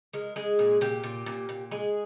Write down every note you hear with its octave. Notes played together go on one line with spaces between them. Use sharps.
G#3 A#4
G#3 G#4
A#2
A#2 G4
A#2
A#2
A#2
G#3 G#4